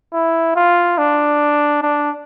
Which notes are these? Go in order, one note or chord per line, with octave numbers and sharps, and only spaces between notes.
E4
F4
D4
D4